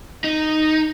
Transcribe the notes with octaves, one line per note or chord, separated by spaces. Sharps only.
D#4